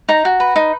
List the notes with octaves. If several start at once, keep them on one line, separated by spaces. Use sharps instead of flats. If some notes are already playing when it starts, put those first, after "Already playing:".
D#4 A#5
F#4
B4
D#4